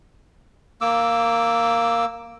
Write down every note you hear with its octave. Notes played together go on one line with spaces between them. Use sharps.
A#3 D6 E6